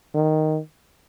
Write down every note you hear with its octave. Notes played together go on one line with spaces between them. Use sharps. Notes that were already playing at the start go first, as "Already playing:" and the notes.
D#3